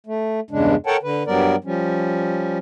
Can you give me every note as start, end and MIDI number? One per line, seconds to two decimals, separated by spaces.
0.07 0.40 57
0.51 0.75 40
0.51 0.75 43
0.51 0.75 49
0.51 0.75 56
0.51 0.75 62
0.86 0.97 69
0.86 0.97 70
0.86 0.97 73
0.86 0.97 78
0.86 0.97 79
0.86 0.97 81
1.03 1.23 50
1.03 1.23 71
1.27 1.56 43
1.27 1.56 54
1.27 1.56 55
1.27 1.56 59
1.27 1.56 70
1.27 1.56 74
1.64 2.58 53
1.64 2.58 55
1.64 2.58 61